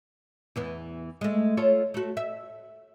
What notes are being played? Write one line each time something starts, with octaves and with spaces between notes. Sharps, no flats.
E2 E3 B3
G#3 A3
F4 A4 C#5
A3 F#4
E5